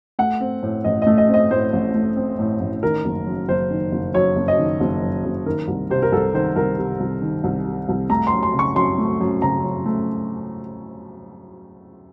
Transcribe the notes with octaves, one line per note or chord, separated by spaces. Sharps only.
A3 F#5
C4
A2
A1 D#5
A3 D#5
D#5
C4
D#5
A2 C5
A1
A3
C4
A2
A1
D#3 A#4
F#1
F#2
F#1 C5
D#3
F#1
F#2 C#5
F#1
D#5
D#3
F#1
F#2
F#1
D#3 A#4
C2
C3 C5
A#4
C2 A4
D#3 C5
C2 A#4
C3
C2
D#3
C2
C3
C2
A3 A#5
C6
F#2
C6
C#3
C#6
F#2 C6
A3
F#2
C#3 A#5
F#2
A3